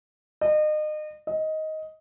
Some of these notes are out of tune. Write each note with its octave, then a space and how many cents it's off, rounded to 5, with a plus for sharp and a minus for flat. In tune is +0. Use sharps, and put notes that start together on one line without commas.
D#5 -35
D#5 +10